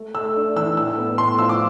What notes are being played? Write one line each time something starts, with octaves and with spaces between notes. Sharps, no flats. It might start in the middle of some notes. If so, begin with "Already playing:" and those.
Already playing: A3
A3 E6
D4
E3 E6
A2 E6
B3
A2 C6
F3 E6
D6